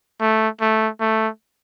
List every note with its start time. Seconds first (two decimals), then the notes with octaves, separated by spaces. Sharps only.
0.21 A3
0.61 A3
1.00 A3